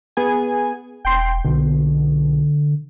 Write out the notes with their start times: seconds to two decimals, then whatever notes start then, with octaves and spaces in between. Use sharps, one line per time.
0.17 B3 G#4 G#5
1.05 E1 G5 C6
1.44 B1 B2 D3